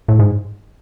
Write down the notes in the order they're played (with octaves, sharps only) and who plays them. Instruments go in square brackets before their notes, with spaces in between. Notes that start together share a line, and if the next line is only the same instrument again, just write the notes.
[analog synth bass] A2
G#2